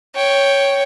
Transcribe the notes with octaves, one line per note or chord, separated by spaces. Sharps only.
C#5 G5